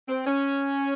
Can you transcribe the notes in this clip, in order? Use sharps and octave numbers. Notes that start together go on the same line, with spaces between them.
C4
C#4